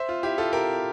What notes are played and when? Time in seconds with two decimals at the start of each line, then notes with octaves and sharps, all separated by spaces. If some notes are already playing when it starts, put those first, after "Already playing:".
Already playing: C5 E5
0.09 F4
0.23 E4 G4
0.38 F4 A4
0.53 G4 A#4